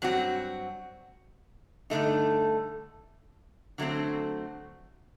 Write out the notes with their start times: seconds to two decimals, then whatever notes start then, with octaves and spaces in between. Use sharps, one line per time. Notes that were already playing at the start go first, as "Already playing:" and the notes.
0.02 G2 F#3 C4 F#4
1.90 G2 D3 A3 D#4
3.78 D3 F#3 A3 C4